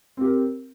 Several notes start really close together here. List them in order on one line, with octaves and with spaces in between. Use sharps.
C4 G4 A#4